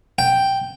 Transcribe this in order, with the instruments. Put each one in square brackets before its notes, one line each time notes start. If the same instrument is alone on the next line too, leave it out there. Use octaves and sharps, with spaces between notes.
[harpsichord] G5